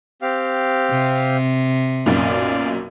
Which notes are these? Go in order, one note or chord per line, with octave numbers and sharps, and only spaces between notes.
C4 G4 F5
C3
B1 F#2 A#2 D5 F5